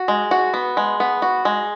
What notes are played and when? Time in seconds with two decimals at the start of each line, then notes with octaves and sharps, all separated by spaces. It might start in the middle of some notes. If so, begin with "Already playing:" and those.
Already playing: F#4
0.08 G#3
0.31 F#4
0.54 B3
0.77 G#3
1.00 B3
1.22 F#4
1.45 G#3